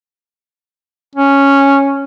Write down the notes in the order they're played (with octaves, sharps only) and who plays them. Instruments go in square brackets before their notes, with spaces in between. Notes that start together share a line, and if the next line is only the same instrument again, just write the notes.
[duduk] C#4